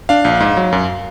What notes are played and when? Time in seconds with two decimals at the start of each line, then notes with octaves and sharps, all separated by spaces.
0.09 D4 F5
0.25 A#1
0.40 G#2
0.57 F#3
0.72 F#2